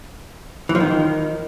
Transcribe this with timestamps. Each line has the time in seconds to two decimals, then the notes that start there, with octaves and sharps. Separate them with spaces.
0.69 E3
0.75 F3
0.80 D#3